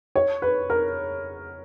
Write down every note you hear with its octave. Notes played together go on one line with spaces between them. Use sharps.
C#5
B4
A#4